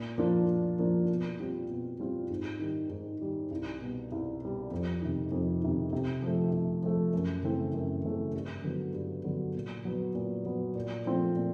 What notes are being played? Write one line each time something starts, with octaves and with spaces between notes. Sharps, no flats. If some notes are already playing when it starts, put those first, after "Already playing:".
Already playing: A#2
F3 A#3 D4 F4
A#2
F3 A#3 D4 F4
B2
G3 C4 F4
B2
G3 C4 F4
G#2
D#3 G3
G#2
D#3 G3
C2
B2 G3
C2
B2 G3
F2
C3 D#3
F2
C3 D#3
C3
F3 A3
C3
F3 A3
F#2
C#3 E3 A3 C4
F#2
C#3 E3 A3 C4
G2
D3 F#3 B3
G2
D3 F#3 B3
A#2
F#3 B3
A#2
F#3 B3
A#2
F3 A3 C4 F4
A#2